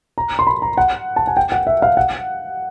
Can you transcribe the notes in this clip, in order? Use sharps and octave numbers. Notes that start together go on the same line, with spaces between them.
A#5
C6
B5
A#5
F#5
A5
G#5
G5
F#5
E5
F5
F#5